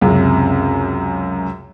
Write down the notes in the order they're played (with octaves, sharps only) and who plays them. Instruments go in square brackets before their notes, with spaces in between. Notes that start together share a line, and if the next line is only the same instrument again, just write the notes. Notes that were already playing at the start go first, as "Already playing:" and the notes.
[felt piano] C#2 F#2 C3